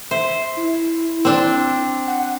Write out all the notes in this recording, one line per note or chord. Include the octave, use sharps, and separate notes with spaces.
C5 E5
E4
C4 D4
F#5